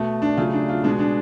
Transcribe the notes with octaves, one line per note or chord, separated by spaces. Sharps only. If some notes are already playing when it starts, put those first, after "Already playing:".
Already playing: B2 A3
D4
C#3 F#3 A3 F4
D4
F4
B2 G#3 D4
D4